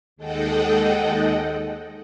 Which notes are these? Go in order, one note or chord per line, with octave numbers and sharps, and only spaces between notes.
D#2 G#3 A4 D#5 F#5 G5